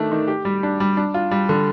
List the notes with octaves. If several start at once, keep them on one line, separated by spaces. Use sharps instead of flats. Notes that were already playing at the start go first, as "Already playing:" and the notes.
Already playing: D#3 A3 D4
D#3
G4
G3
D4
G3
D4
F4
G3
D3